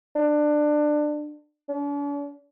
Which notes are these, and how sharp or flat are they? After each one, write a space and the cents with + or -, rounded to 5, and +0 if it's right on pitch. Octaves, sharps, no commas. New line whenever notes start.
D4 +20
D4 -45